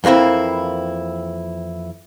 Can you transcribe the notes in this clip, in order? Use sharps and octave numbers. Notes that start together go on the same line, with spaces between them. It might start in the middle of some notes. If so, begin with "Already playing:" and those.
F2 E3 A#3 C4 E4